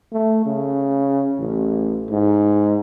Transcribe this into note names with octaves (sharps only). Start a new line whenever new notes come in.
A3
C#3
A1
G#2